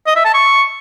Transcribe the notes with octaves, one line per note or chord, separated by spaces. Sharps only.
D#5
E5
A5
C#6